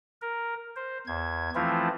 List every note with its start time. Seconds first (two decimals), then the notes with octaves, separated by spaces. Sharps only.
0.22 A#4
0.76 C5
1.07 E2 G#6
1.55 E3 F3 A3 C4 E4 F4